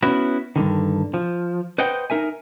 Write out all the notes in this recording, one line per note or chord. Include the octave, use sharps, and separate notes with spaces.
B3 C#4 E4 F#4
G2 B2 D3 D#3
F3
B4 C5 D#5 F#5 G5
D#4 A#4 E5 G#5